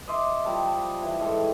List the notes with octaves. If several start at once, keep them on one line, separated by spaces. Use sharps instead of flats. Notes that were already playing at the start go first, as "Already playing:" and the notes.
D#5 E5 C6 D6
F3 G3 A5
E3
G#2 A4 G5 A5